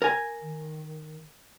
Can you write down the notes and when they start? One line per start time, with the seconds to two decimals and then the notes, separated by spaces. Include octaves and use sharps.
0.02 A#4 G#5
0.42 D#3